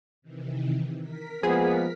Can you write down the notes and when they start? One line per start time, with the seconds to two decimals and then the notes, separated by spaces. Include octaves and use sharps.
0.22 C3 D#3 E3
1.01 A#4 B6
1.43 F3 G#3 A#3 B3 G#4